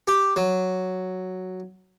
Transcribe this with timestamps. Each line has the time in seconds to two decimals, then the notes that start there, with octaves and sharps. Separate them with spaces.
0.08 G4
0.36 F#3